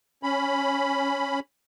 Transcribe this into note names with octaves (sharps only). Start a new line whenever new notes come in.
C#4 B5